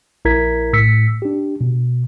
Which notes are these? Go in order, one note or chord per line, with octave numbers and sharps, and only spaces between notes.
A#1 E4 A#4 A#5 G#6 B6
A2 E6 B6 C#7
D4 G4
B2